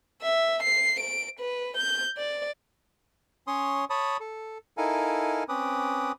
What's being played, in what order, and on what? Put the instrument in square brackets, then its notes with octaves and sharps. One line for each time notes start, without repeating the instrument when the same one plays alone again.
[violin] E5
C7
D7
B4
G6
D5
[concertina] C#4 C#5 C6 D#6
C#5 A5 B5 D#6
A4
D#4 E4 A4 A#4 F5 G#5
C4 C#4 B4 D6 D#6